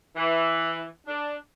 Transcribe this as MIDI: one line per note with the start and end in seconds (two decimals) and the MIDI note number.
0.16 0.86 52
1.07 1.36 62